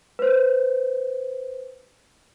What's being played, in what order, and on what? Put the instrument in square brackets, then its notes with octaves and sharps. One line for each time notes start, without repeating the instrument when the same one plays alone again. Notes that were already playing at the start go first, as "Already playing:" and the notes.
[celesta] B4 C5